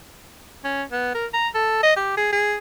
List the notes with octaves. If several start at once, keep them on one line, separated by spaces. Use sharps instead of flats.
C#4
B3
A#4
A#5
A4
D#5
G4
G#4
G#4